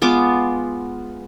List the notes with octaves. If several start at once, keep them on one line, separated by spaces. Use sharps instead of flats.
G#3 B3 F4 D6